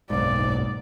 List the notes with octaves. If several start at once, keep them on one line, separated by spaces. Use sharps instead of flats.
F#1 B1 G#2 D5